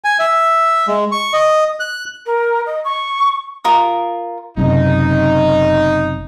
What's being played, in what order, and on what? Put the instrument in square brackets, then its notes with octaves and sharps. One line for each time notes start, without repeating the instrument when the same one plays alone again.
[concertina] G#5
E5
G#3
C#6
D#5
F#6
[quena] A#4
D#5
C#6
[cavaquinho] F4 A#4 D#6
[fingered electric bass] F#1 F#2 C3 [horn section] D#4